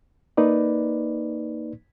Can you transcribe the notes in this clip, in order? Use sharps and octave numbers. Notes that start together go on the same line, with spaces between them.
A#3 D#4 B4 D5